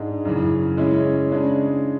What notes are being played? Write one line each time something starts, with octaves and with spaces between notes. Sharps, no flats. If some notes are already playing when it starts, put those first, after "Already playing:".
Already playing: G#2 G#3 D4
F#2 C#3 E3
C#3 G#3 C#4 E4
C#3 G#3 D4